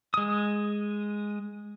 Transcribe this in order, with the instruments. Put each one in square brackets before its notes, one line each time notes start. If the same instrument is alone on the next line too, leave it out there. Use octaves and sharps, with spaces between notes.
[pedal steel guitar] G#3 D#6